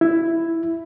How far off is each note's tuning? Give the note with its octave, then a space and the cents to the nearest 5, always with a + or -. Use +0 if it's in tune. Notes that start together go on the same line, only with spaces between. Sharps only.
E4 +5